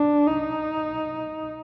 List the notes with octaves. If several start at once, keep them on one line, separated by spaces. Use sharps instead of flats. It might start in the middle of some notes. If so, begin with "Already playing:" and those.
Already playing: D4
D#4